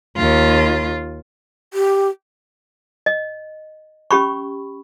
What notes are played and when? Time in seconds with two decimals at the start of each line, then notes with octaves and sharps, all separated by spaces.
0.16 D#2 F4
1.74 G4
3.06 D#5
4.11 C#4 G4 B5 C#6